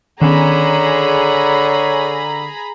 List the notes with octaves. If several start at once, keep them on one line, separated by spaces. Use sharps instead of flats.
D3 D#3 B3 C#4 G#4 C#5 A#5 B5